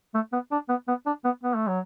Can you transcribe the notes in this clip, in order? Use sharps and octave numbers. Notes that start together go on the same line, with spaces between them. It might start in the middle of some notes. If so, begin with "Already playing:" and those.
A3
B3
D4
B3
B3
D4
B3
B3
A3
F#3